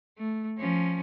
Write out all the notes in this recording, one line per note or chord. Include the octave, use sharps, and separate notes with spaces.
A3
F3 C#4